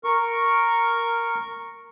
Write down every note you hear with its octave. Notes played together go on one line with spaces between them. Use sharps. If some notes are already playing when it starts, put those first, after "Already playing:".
A#4 C#6